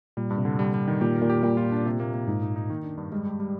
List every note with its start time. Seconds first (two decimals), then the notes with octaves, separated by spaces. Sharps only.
0.17 A#2 G3
0.30 G2
0.38 C3
0.45 D3
0.59 G3
0.74 G3
0.88 D#3
1.01 A#2 G4
1.16 A#4
1.22 A#2
1.30 G4
1.44 A#2 G3
1.57 F4
1.72 D4
1.86 C3
2.00 A#3
2.14 A#3
2.28 G#2 D#4
2.42 D#4
2.56 D#4
2.70 D#3
2.84 D4
2.97 G2
3.12 G3 G#3
3.27 G4
3.40 G3